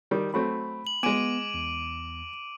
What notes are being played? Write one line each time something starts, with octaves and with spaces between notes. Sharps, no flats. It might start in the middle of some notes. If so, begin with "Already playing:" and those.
D#3 G3
F#3 A3 C4 B5
F#7
G#3 B3 G#5 D6 D7 D#7
E2